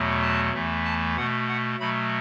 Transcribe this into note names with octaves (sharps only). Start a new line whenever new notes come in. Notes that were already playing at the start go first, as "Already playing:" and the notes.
Already playing: E2 B2 F#3 A3
A5
E2 E3 A3
A5
B2 A3 F#5
F#5
B2 F#3 A3 B5